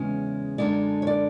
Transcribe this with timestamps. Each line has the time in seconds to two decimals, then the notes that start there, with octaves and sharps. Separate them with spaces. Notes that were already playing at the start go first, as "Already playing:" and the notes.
Already playing: E2 C#3 G#3 C#4 C#5
0.58 F#2 D3 G#3 D5
1.02 C#5
1.07 D5